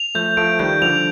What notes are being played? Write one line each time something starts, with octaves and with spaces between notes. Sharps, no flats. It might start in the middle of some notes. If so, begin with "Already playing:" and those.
Already playing: F7
F3 A3 G6
F3 A3 D7
D#3 G3 G6
D3 F3 F7